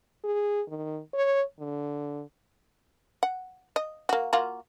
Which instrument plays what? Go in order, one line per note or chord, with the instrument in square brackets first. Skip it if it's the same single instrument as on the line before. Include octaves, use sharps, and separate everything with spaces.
[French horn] G#4
D#3
C#5
D3
[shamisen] F#5
D#5
A#3 F#4
A#3 F4 F#4